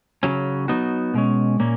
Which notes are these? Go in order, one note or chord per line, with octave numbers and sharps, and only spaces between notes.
C#3 F#3 C#4
F#3 B3 D#4 F#4
B2 G#3 C#4
A#2 A#3 C#4